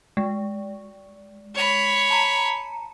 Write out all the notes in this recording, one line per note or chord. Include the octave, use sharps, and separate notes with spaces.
G#3
C#5 B5
A5 A#5 C#7